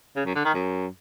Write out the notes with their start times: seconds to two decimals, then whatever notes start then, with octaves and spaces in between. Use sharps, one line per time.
0.16 C#3
0.26 F#2
0.35 D3
0.45 D#3
0.54 F#2